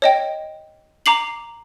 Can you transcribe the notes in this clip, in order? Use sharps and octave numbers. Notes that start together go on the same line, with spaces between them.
C#5 D#5 G5
A#5 D6 C7 F#7